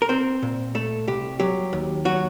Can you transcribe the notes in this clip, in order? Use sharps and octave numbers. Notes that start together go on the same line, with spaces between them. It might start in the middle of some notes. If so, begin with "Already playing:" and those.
A#4
C4 C5
A#2
A3 A4
C2 G4
F#3 G4
D#2
F#3 F#4